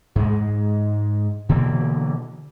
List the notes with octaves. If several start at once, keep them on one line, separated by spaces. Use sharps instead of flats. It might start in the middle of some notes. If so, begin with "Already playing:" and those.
G#2 G#3
B2 D3 E3 A#3